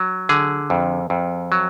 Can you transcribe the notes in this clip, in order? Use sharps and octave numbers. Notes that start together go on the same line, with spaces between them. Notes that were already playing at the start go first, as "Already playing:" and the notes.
Already playing: F#3
D3 G#4
F2
F2
F#3